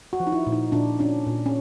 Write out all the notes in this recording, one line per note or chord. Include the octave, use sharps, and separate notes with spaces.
F#4
F3
D#4
E4
A#2
D#4
A#2 D4
C#4 D4
A#2
C#4